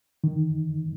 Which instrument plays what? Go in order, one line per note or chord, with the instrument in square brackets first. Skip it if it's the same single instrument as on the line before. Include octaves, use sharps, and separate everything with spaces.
[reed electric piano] D#3